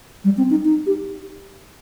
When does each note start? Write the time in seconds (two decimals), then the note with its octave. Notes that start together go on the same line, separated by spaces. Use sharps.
0.24 G3
0.37 C4
0.50 D#4
0.65 D#4
0.86 G4